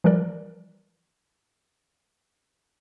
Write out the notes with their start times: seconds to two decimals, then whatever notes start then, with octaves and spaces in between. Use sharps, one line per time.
0.04 E3 F3 G3 A#4 D5